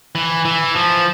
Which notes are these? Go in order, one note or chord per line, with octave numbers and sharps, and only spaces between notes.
E3
E3
F3